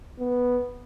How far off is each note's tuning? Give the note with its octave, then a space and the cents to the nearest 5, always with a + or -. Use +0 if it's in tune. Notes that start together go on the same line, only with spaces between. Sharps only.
B3 -5